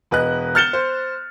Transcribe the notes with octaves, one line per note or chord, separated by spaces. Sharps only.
E1 B4 D#5 F#6
F6 G6 A6 C#7 E7 G7
C5